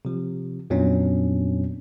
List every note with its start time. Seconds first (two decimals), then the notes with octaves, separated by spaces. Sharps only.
0.05 C3 F3
0.70 F2 A#2 F#3 B3 C#4 D4